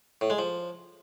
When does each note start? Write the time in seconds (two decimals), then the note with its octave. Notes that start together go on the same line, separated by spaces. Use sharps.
0.21 A2
0.30 G#3
0.39 F3